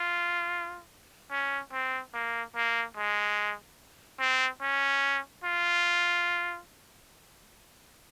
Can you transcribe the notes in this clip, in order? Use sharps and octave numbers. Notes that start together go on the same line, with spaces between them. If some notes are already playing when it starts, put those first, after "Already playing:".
Already playing: F4
C#4
C4
A#3
A#3
G#3
C4
C#4
F4